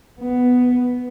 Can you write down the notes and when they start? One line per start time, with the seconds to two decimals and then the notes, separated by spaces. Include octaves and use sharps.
0.21 B3